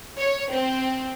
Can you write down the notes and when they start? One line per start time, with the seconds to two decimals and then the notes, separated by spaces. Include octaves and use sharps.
0.18 C#5
0.52 C4